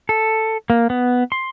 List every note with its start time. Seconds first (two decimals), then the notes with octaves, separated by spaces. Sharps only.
0.09 A4
0.70 A#3
0.90 B3
1.32 C6